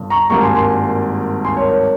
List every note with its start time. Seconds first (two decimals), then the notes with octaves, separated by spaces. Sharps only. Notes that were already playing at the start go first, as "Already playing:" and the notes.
Already playing: G1 G2
0.10 A#5 C#6
0.30 G#1 G2 G3 A#3 A#5 C#6
0.42 G#5 C6
0.55 G#5 C6
1.45 G#5 C6
1.57 A#4 C#5
1.69 A#4 C#5